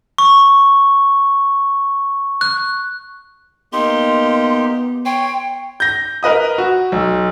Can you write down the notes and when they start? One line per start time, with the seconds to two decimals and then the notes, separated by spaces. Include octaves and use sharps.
0.18 C#6
2.41 F#6
3.73 A#3 B3 D#4 G4 C6
5.05 C#5 G5 C6
5.80 G6 A#6
6.23 A#4 B4 D#5 D#6
6.58 F#4
6.92 B1